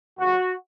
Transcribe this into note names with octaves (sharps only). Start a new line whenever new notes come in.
D#2 C#3 F#3 F#4